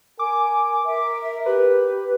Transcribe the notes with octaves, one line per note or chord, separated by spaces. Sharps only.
A#4 G#5 D6
A#4 E5
G4 B4